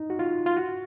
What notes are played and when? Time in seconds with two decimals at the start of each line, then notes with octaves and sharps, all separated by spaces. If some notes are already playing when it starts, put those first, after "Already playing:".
Already playing: D#4
0.10 F#4
0.19 F4
0.46 F4
0.57 F#4